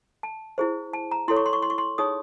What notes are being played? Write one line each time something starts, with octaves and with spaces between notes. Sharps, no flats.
A5
E4 G#4 C5
A5
A#5
E4 A4 C#5 C6
C#6
C6
C#6
C6
C#6
C6
D#4 G#4 C#5 D#6